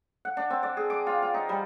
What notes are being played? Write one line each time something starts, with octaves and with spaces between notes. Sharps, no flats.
F#5
D4
C4
D5
G#4
D6
F4
F4
D#4
G3